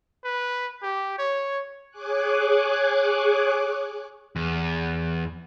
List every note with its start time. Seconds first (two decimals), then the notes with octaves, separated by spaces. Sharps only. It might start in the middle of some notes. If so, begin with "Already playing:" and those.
0.24 B4
0.83 G4
1.19 C#5
1.91 G#4 C#5 G#5 D6 F#6
4.36 E2